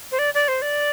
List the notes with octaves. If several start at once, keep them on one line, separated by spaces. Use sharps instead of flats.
C5
D5
D5
C5
D5